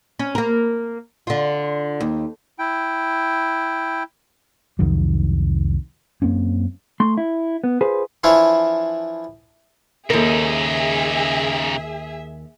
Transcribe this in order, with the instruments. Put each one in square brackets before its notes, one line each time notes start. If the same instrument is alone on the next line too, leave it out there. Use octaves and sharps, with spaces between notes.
[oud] C#4
A#3 A#4
D3 F4
D#2
[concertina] E4 G5
[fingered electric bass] C2 F2 D#3 F#3
F#2 A#3 C4 C#4
[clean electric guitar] A3 C6
E4
B3
F4 G#4 B4 C5
[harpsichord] E3 F3 D4 E4 F4 C#5
[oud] D#2 A#4 [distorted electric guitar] C#3 D#4 [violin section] G#4 E5